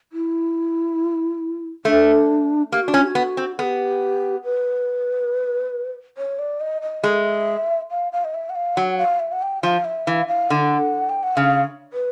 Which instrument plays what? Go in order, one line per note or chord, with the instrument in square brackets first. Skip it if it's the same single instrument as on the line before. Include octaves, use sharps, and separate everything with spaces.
[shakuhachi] E4
[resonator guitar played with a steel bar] A3 [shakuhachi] D4
[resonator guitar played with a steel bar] A#3 [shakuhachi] G4
[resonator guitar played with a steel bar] D4 [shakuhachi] F#4
[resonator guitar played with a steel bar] C#4 [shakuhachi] F4
[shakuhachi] G4
F#4
[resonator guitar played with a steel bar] B3
C4
[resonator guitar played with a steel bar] B3 [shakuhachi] G4 A4
[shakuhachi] B4
C#5
D5
D#5
D#5
[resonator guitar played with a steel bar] G#3 [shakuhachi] E5
[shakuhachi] F5
F5
D#5
E5
F#5
F5
[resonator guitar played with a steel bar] F#3 [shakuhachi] F#5
[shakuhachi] F5
E5
F#5
G5
[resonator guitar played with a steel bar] F3 [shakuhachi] F5
[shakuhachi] E5
[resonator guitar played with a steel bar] E3 [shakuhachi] F5
[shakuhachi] F5
[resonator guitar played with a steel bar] D3 [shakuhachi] F#5
[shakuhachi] G5
F#5
[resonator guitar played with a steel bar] C#3 [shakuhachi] F5
[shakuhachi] B4